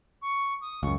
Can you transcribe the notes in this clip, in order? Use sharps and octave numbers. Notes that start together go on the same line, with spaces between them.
C#6
D#6
C#2 F#2 C#6